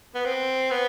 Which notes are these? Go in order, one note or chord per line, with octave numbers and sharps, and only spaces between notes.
B3
C4
B3